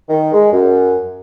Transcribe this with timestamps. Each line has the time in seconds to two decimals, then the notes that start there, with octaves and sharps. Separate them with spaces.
0.09 D#3
0.33 G#3
0.52 F#2